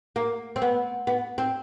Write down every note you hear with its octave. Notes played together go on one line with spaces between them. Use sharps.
A#3
C4
B3
B3
C4